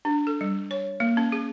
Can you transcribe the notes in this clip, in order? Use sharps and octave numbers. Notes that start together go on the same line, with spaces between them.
D4
A4
G3
C#5
A#3
C#4
G#4